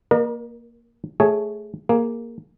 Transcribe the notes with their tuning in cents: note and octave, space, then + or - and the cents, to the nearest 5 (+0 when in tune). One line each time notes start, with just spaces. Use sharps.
A#3 +0 A#4 +35 D#5 -45
A3 -10 G#4 +0 C#5 +0
A#3 +0 G#4 +0